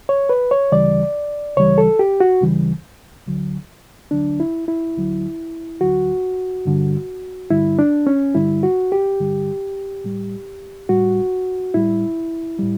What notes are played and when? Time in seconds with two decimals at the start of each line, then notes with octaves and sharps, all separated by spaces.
0.09 C#5
0.29 B4
0.51 C#5
0.72 D2 C#3 E3 G3 D5
1.57 D2 C#3 E3 G3 C#5
1.78 A4
1.99 G4
2.20 F#4
2.42 D2 C#3 E3 G3
3.26 D2 D3 F#3
4.11 D2 D3 F#3 D4
4.40 E4
4.68 E4
4.96 D2 D3 F#3
5.81 D2 D3 F#3 F#4
6.65 G2 D3 G3
7.50 G2 D3 G3 E4
7.79 D4
8.07 C#4
8.35 G2 D3 G3 E4
8.63 F#4
8.92 G4
9.20 G2 D3 G3
10.04 A2 G3
10.89 A2 G3 F#4
11.74 A2 G3 E4
12.59 A2 G3